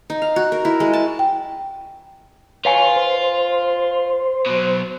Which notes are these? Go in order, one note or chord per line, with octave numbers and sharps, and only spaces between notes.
D#4
F5
F#4
A#4
E4
G#3
A5
G5
F4 B4 C#5 F5 G#5
C5
B2 F#3